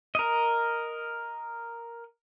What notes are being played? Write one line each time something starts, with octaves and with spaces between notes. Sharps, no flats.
A#4 D#5